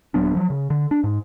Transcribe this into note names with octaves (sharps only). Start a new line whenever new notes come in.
D#1 F#3 B3 D4
F3 F#3
C#3
D3
D4
G#2